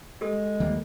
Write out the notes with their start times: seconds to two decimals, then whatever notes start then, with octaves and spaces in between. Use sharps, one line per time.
0.21 G#3 G4 A4 D#6
0.60 D#2 E3 G3 A#3